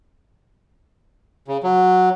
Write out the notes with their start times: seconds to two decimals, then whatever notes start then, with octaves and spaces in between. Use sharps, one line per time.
1.48 C#3
1.63 F#3